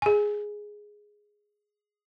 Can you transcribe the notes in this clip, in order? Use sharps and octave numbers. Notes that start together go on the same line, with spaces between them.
G#4 G#5